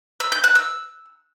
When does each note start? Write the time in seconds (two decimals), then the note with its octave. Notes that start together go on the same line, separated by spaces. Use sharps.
0.20 E6
0.32 G6
0.44 F#6
0.55 E6